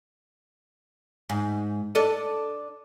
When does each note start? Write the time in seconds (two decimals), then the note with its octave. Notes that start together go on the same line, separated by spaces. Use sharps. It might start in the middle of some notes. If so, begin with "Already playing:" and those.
1.29 G#2
1.95 D4 A4 D#5